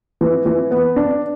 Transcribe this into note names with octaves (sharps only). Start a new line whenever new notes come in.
E3
E3
B3
D4